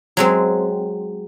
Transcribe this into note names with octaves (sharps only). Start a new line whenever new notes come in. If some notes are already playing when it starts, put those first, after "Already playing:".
F#3 G#3 C4